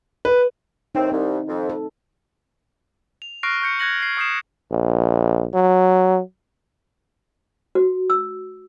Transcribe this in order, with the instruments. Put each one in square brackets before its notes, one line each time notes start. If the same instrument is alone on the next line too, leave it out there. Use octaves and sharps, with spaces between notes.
[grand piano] B4
[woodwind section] D#2 A2 C4 [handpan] D#4
[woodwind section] C2 [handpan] C4
[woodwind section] F2
[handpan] A4
[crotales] F7
C#6 F6 F#6 A#6 C7 D7
C#6 G6 C#7
F#6 G#6 A#6 F#7
G#6 C7
C#6 D#6 G6 C7 E7
[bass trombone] A#1
F#3
[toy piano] F#4
E6